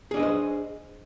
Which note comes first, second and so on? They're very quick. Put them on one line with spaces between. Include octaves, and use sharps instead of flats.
G#4 D4 D#5 B4 C5